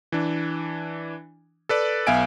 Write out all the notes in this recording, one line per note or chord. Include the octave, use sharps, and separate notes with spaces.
E3 D4
A4 B4 D5
B1 B3 E5 F5 G#5 D7